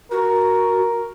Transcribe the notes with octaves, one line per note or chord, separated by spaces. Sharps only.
F#4 A#4